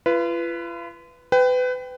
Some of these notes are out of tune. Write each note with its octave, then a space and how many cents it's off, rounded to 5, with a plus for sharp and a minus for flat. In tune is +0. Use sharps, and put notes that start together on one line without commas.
F4 -40 B4 +0
B4 +30 G5 +0